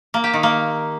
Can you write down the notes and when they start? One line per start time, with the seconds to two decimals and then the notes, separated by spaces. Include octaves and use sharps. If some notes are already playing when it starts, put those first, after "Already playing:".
0.14 A#3
0.24 G4
0.33 D#3
0.43 A#3